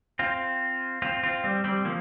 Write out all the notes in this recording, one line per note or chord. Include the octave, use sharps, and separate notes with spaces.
C4 F4
C4 F4
C4 F4
G3 C4
G3 C4
F3 A#3